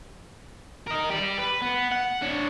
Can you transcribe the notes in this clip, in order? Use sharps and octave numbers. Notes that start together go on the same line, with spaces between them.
A#4 D#5
G4 D5
B4
B3
F#5
D4 C#5